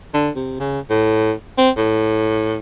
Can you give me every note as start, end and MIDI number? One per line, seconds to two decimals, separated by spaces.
0.14 0.30 50
0.36 0.58 48
0.60 0.80 49
0.90 1.32 45
1.58 1.70 60
1.77 2.57 45